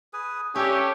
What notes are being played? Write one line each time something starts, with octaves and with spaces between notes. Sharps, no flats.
G#4 B4 G#5
C#4 D4 G4 A4 C#5 E5